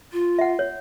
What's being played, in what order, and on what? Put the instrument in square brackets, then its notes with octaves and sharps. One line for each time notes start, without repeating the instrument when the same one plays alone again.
[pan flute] F4
[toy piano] E5 F#5
C#5